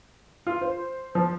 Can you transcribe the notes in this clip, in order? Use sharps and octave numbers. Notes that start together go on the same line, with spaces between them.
F4
C5
F3